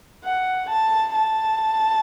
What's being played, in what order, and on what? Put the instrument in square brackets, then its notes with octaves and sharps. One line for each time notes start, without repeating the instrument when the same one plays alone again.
[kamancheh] F#5
A5
A5